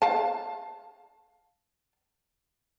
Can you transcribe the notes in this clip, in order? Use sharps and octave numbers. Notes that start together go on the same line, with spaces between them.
F5 A5